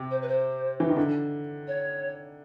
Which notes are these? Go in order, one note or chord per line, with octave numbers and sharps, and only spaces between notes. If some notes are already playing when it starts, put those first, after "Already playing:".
Already playing: C3
C5
B4
C5
E3
D#3
D3
C#5